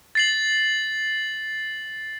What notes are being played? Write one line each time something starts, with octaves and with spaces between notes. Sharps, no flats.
A6 C7 F#7